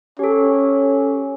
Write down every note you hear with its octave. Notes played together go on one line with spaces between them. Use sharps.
C#4 G4 A4